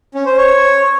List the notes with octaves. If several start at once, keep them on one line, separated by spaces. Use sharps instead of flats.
C#4
C5
C#5